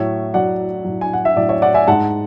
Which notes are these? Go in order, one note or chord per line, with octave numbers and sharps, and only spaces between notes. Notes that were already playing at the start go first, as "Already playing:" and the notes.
Already playing: A2 F#3 C#5 E5
A2 F#3 D5 F#5
A2 F#3
G#5
F#5
E5
A2 F#3 D5
C#5 E5
D5 F#5
E5 G#5
G#2 G#3 F#5 A5